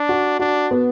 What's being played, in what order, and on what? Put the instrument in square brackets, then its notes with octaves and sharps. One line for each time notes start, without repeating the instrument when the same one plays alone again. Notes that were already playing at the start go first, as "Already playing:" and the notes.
Already playing: [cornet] D4
[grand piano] F#4
[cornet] D4 [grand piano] F#4
[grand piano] B3